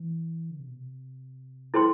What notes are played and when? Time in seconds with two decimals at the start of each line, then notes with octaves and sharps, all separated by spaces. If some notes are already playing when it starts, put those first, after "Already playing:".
Already playing: E3
0.50 D3
0.59 C3
0.68 B2
0.77 C3
1.74 B2 E4 A4 C5 G5 C6